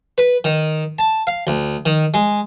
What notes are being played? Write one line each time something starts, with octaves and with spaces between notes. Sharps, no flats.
B4
D#3
A5
F5
D2
D#3
G#3